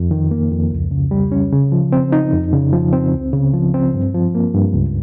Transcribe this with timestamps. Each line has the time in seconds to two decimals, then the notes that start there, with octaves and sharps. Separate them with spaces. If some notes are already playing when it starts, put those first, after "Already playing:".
Already playing: F2
0.11 D#3
0.31 A#3
0.51 F2
0.71 C#2
0.91 C#3
1.11 G3
1.32 C#4
1.52 C#3
1.72 F3
1.92 C4
2.12 D#4
2.33 F2
2.53 C#3
2.73 F3
2.93 C4
3.13 C#2
3.33 C#3
3.54 F3
3.74 C4
3.94 G2
4.15 F3
4.35 A#3
4.55 G2
4.75 C#2